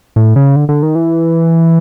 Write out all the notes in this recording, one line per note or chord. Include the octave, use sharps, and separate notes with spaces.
A2
C#3
D3
D3
D#3
E3